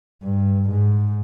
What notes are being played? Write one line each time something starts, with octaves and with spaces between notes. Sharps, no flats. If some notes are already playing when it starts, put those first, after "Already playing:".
G2
G#2